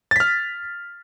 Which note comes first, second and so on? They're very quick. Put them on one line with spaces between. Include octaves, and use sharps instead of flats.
A6 B6 F6